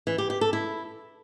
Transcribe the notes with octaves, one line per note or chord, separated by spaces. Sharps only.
E3
G4
G4
A4
E4